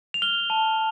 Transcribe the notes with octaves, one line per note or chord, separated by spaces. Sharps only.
F7
F6 G7
A5